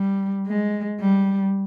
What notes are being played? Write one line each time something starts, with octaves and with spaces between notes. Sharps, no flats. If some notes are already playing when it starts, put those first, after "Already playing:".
Already playing: G3
G#3
G3